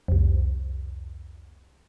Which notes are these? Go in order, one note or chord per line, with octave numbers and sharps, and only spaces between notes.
C2 F2